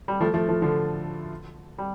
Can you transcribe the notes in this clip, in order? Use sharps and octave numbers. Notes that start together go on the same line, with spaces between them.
G3
F3 A3
F3 A3
F3 A3
D3 F3
G3